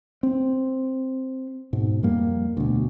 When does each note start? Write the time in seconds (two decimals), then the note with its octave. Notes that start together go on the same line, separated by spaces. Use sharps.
0.23 C4
1.73 G#2 B2
2.03 F2 G3 A#3
2.57 D2 B2